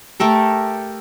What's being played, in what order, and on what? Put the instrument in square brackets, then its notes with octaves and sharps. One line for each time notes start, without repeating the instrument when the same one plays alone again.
[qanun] A3 G4 A4 A#4